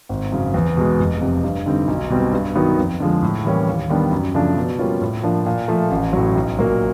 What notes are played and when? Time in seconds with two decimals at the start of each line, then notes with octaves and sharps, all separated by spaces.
0.09 G#1
0.32 F#2 C#3
0.54 E2
0.77 B2 G#3
1.00 F1
1.21 F2 C3
1.44 G2
1.66 D3 G3 C4 D#4
1.88 B1
2.10 B2 G3 C4
2.33 G2
2.55 D#3 F#3 B3 D#4
2.78 F2
3.00 D3 F3 G#3
3.22 A2
3.45 E3 G3 A#3 C#4
3.67 D#2
3.90 D#3 G3 B3 D4
4.12 F#2
4.34 C#3 F3 A3 D4
4.57 B2
4.79 G3 A#3 C#4 F4
5.01 A2
5.23 F3 A#3 D4
5.46 A#2
5.68 F3 A3
5.91 A1
6.13 A2 F#3
6.35 B1
6.58 A#2 F#3 A#3